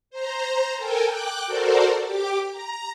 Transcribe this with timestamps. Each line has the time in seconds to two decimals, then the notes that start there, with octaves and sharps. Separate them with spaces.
0.10 C5 A#5
0.77 A4 A#4 G5 G#5
1.08 G5 D6 F#6
1.46 F#4 A4 A#4 C5 D5
2.04 G4 D6
2.51 A#5